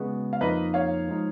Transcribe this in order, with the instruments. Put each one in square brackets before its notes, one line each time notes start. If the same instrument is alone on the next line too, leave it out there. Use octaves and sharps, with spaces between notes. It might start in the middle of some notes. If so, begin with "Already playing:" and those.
Already playing: [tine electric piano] C#3 G#3 B3 F#4
[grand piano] F5
[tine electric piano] F2 F3 A#3 D#4 [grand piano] B4 D#5
[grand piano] C#5 F5
[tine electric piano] F3 G#3 D#4